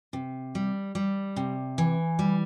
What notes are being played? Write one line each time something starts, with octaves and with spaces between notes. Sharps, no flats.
C3
G3
G3
C3
E3
G3